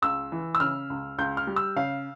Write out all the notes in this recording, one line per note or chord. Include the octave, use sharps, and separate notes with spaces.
C#2 E6
E3
E6
C#3 F6
C#2
C#2 G6
F6
G3
E6
C#3 F5